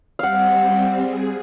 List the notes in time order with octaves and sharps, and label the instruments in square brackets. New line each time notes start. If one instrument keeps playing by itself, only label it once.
[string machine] G3 C4 [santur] F5 F#5
[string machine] G#4